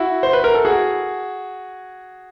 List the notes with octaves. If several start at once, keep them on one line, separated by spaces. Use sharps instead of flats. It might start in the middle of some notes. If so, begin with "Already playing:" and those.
Already playing: E4 F#4
C5
B4
A#4
A4
F#4 G#4